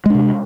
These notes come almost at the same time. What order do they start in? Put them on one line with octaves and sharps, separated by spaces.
G#3 D4 C3